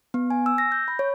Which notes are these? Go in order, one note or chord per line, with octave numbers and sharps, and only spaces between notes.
B3
G#5
E6
A#6
G6
B5
C#5